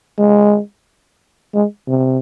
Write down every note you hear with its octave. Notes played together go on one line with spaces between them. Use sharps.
G#3
G#3
C3